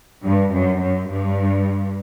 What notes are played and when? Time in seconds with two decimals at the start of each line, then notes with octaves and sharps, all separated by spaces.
0.24 G2
0.53 F#2
0.81 F#2
1.10 G2